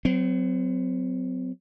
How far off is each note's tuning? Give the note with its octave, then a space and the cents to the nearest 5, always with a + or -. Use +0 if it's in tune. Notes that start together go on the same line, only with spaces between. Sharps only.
F#3 +0 C4 -35